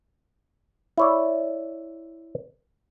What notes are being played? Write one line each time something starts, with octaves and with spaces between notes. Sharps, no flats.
E4 C#5 D5